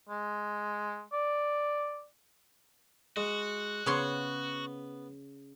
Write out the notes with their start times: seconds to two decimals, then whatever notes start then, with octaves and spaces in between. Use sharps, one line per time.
0.09 G#3
1.13 D5
3.17 G#3 F#4
3.86 C#3 B3 C#5 C6